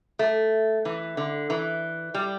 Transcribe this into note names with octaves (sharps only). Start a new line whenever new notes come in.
A3
E3
D3
E3
G3